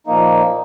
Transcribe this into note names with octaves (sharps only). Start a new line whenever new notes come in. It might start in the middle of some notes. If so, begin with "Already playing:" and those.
A#2 F3 A#3 D#4